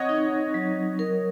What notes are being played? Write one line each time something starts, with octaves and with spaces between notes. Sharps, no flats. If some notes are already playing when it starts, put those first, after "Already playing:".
Already playing: C4 C#5 D#5 F#5
D#4
F#3
A#4